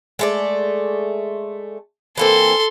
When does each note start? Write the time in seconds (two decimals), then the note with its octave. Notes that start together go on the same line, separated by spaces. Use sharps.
0.19 G#3 A3 D5
2.17 E3 A#3 C4 A4 C6